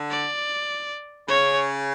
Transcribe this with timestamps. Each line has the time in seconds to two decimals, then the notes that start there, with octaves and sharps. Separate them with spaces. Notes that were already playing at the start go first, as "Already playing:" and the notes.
Already playing: D3
0.10 D5
1.28 C#3 C#5